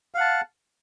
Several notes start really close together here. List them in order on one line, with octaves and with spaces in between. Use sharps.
F5 F#5 A5